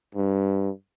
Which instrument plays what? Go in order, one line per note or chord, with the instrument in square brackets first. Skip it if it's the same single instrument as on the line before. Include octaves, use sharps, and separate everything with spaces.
[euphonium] G2